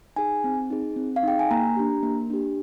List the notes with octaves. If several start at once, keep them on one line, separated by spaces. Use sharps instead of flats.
D#4 G#4 G#5
C4
D#4 G#4
C4
F5
D#4 G#4 G5
G#5
A#3 A#5
D4 G4
A#3
D4 G4